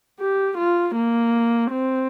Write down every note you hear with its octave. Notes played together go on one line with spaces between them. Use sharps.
G4
F4
A#3
C4